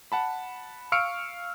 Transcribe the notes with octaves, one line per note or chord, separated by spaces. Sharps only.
F#5 A5 B5
F5 C#6 E6 F6 C#7 D7